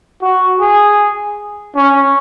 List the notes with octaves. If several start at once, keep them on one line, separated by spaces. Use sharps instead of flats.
F#4
G#4
C#4